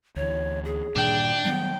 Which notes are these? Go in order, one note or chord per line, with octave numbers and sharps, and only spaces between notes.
D2 E3 C#5
G#4
G2 A#2 D#3 D4 G5
D#3 F#3 G3 B3